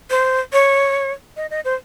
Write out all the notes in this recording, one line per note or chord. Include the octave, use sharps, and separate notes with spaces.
C5
C#5
D#5
D#5
C5